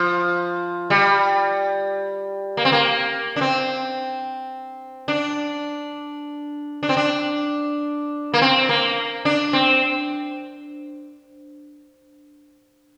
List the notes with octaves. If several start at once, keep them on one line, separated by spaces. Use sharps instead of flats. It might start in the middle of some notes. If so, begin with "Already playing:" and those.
Already playing: F3
G3
A#3
C4
A#3
D4
C4
D4
D4
C4
D4
A#3
C4
A#3
D4
C4